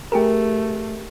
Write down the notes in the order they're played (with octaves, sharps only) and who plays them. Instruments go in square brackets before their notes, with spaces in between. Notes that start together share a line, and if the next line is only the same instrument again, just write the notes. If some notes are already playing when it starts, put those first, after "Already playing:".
[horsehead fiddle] A3 [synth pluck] G4 G#4 A#4